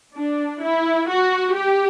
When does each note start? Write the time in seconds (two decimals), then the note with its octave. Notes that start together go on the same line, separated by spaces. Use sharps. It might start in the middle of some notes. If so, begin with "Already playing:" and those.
0.17 D4
0.62 E4
1.08 F#4
1.55 G4